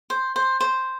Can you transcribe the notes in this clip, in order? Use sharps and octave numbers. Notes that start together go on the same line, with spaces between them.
C5
C5
C5